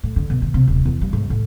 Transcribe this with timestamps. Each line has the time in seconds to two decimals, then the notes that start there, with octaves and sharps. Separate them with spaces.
0.03 A2
0.16 D3
0.30 B2
0.42 D#3
0.54 C3
0.68 D#1
0.85 E2
1.01 G3
1.13 G#2
1.30 A2